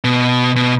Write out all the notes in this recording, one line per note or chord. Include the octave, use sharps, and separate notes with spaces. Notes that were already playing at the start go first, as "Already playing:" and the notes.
B2
B2